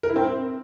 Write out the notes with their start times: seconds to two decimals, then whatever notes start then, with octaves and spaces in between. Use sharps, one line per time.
0.03 A#4
0.10 E4
0.16 C4